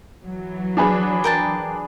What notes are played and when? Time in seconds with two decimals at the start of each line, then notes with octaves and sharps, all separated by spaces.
0.25 E3 F#3
0.77 D4 G#4 B4
1.24 A#4 G5 A5